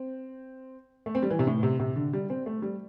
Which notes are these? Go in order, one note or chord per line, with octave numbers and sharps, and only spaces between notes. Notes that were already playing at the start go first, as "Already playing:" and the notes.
Already playing: C4
A3
C4
G3
E3
C3
A2
C3
C3
D3
G3
C4
A3
G3